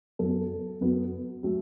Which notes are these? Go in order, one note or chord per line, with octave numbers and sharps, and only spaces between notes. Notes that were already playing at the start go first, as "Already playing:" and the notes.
F#2 F#3 B3 A4
F#2 F#3 B3
F#3 A3